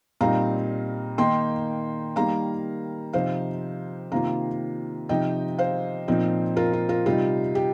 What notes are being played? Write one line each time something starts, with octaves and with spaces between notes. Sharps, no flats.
A#2 G3 C4 D#4 F5 A#5
D#3 A#3 D#4 G5 C6
D#3 G3 A#3 F5 A#5
C3 F3 D#4 C5 F5
C3 D#3 A#3 F4 F5 A#5
C3 F3 D#4 D#5 G5
C5 F5
A#2 F3 C4 D#4
F4 A#4
F4
F4 A#4
C3 G3 D#4 F4
G4